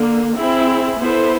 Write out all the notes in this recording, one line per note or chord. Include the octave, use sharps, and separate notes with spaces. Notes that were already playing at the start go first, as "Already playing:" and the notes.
Already playing: D3 A#3
C4 E4 G#4
B3 E4 A4 C5